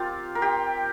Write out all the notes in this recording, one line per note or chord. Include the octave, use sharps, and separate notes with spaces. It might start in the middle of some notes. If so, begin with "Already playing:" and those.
Already playing: C4 F4 G4 A#4
A#4
G4